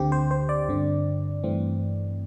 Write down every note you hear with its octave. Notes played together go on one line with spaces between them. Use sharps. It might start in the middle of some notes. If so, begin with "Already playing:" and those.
Already playing: D2 D3 C4 G4
C5
C5
D5
G2 D3 C4
G2 E3 A3 C4